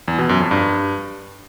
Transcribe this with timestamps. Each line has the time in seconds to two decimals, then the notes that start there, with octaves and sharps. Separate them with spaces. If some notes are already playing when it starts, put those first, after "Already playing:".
0.08 E2
0.18 B2
0.29 F#2
0.40 F2
0.51 G2